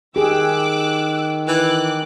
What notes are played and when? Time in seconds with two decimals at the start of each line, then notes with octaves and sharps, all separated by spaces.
0.16 D#3 G4 G#4 D6 E6 F#6
1.48 E3 D6 F#6